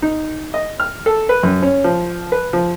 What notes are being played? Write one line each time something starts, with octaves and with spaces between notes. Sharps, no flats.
D#4
D#5
F6
A4
B4
F#2
C#4
F3
B4
F3